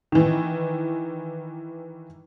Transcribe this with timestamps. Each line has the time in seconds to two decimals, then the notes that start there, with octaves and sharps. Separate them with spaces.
0.12 D#3 E3